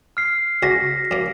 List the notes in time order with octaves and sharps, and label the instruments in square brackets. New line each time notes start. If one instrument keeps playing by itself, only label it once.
[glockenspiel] F6 C7
[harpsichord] C#2 F#4 [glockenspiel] A#6 B6
[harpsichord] F#2 A#3